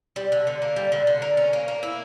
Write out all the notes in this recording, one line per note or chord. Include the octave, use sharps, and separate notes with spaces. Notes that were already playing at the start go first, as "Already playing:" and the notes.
G3
D3
D3
A#3
G3
D3
D3
A#3
C#4
A#3
A#3
E4